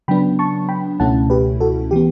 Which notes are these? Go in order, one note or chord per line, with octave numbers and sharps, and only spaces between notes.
C#3 F#3 B3 D4 G5 B5
A5 C#6
G5 B5
C#2 B2 A3 C#4 E4 F#5 A5
G4 B4
F#4 A4
E3 B3 G4